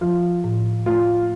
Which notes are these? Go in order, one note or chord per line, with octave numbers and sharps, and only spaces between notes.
F3 F4
A2
A3 F4